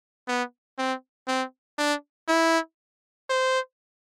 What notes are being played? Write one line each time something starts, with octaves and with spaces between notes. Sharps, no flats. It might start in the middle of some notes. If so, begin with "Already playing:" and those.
B3
C4
C4
D4
E4
C5